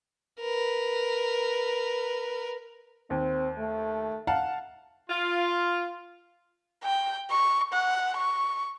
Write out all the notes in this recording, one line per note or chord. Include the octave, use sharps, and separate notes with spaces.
A#4 B4
D#2 C4
A3
F5 F#5 A5
F4
G5
C#6
F#5
C#6